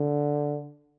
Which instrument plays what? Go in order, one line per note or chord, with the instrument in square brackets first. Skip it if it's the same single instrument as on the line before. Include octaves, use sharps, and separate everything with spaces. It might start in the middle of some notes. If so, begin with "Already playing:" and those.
Already playing: [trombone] D3